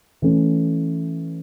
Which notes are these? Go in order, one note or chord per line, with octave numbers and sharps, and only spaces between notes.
E3 A3 C#4